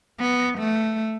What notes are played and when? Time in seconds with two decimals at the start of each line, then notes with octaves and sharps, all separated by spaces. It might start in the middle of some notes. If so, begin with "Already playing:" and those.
0.20 B3
0.59 A3